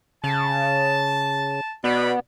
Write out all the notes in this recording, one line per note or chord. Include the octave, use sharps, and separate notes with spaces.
C#3 A5
B2 B3 D5 B5